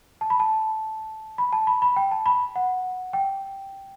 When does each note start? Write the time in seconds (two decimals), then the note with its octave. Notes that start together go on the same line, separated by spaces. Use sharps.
0.21 A5
0.30 B5
0.40 A5
1.38 B5
1.53 A5
1.67 B5
1.82 B5
1.96 G5
2.12 A5
2.26 B5
2.56 F#5
3.13 G5